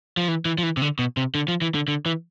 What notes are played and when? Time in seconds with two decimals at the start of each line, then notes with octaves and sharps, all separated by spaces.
0.17 F3
0.28 E3
0.45 E3
0.58 F3
0.63 E3
0.77 C3
0.82 D3
0.99 B2
1.17 C3
1.35 D3
1.48 F3
1.62 E3
1.74 D3
1.88 D3
2.06 E3